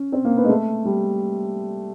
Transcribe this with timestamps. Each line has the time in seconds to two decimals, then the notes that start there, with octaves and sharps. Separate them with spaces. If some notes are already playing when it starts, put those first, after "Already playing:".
Already playing: C#4
0.12 C4
0.25 A#3
0.37 B3
0.44 G#3
0.49 A3
0.85 G3